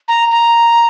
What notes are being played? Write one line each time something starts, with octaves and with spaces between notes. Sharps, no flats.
A#5
A#5